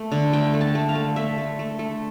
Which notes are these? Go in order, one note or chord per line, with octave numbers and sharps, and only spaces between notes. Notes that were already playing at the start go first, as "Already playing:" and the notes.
Already playing: A3
D3
A3 G5
A3
A5
A3
F5
A3
A3 E5
A3
A3
A3